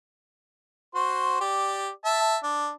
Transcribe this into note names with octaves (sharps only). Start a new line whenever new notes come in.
F#4 C5 C6
G4 D5
E5 A5
D4